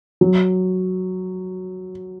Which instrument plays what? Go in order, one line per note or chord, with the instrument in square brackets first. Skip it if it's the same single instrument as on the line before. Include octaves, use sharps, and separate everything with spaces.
[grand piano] F#3